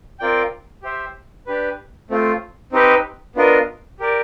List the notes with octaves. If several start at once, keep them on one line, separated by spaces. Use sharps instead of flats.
C4 F4 A#4 D5 G5
G4 C5 E5
D4 G4 B4
A3 C4 F4
C4 D#4 G4 B4 D#5
B3 D4 F4 A#4 D#5
G4 A#4 D5